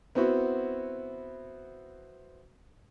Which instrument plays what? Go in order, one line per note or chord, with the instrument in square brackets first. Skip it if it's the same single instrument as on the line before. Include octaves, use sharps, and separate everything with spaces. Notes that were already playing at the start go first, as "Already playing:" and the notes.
[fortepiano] B3 C4 E4 F#4